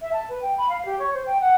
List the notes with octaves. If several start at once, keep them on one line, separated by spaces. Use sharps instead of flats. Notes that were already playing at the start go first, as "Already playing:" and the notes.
E5
A5
B4
G5
B5
F5
G4
C#5
C5
G5
F#5